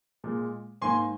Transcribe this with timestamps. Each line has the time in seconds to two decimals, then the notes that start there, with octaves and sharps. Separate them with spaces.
0.24 A#2 G#3
0.82 G#2 D#3 A#3 G#5 C6